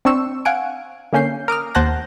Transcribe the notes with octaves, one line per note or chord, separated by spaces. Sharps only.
C4 D4 C6 C#6 E6
F5 F#5 G#5 D7
D3 A#3 C#4 G6 C7
A#4 D6 D#6 F6
D#2 C5 F#5 A5 F#6 A#6